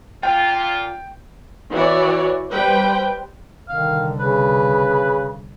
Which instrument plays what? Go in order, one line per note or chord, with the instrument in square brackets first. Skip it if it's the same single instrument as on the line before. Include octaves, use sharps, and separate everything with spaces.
[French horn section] A#2 F4 [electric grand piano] G5
[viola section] E3 F#4 C#5 D5
G3 B4 C5 G5
[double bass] C2 D3 [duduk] D#3 [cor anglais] F5
[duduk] C#3 [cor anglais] B4